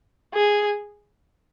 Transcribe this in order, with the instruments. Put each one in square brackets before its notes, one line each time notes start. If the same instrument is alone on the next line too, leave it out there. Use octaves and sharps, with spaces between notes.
[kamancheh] G#4